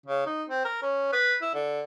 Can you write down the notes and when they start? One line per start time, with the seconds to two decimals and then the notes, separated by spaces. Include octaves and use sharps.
0.06 C#3
0.26 D#4
0.49 C4
0.65 A#4
0.82 C#4
1.13 B4
1.42 E4
1.54 D3